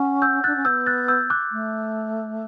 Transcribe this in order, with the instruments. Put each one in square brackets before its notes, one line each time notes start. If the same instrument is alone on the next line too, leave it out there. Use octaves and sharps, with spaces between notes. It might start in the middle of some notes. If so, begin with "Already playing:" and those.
Already playing: [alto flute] C#4 [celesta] F#5
[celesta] E6 G6
[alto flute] D4 [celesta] F#6 A6
[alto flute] C#4
[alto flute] B3 [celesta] E6 G6
[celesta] F#6 A6
E6 G6
D6 F#6
[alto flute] A3